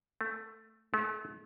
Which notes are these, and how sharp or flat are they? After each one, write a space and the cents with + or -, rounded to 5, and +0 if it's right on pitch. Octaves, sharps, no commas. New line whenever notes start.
A3 +10
A3 -40